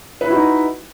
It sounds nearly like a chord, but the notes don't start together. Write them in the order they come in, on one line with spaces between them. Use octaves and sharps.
B4 E4 F#4 D#4